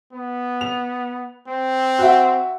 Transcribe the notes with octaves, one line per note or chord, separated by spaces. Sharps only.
B3
F7
C4
F#4 E5